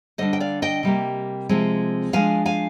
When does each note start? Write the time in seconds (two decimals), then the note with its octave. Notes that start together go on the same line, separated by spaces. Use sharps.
0.18 D3 G3 D4 C5 D#5
0.33 G5
0.40 D5 F5
0.62 D#5 G5
0.83 C3 G3 A#3
1.49 C3 F3 G#3 C4
2.13 F3 G#3 D4 F5 G#5
2.46 F5 G#5